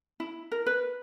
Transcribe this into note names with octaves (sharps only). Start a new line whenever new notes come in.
E4
A#4
B4